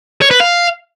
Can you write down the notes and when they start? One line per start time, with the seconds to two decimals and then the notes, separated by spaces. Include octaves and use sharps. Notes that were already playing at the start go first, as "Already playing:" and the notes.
0.22 C#5
0.31 B4
0.40 F5